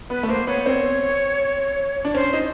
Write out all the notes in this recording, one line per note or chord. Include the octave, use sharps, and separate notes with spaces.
B3 B4
A3
A#3 C5
B3 C#5
C4
D4
C#4 C5
D#4